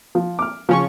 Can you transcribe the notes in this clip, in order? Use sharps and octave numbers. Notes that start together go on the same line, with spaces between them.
F3
D6 F6
C#3 F3 C#4 C#6